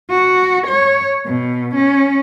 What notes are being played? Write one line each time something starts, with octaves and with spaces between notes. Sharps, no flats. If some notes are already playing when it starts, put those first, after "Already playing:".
F#4
C#5
B2
C#4